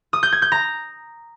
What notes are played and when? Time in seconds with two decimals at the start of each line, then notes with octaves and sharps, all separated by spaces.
0.13 D#6
0.23 G6
0.32 G#6
0.42 G6
0.52 A#5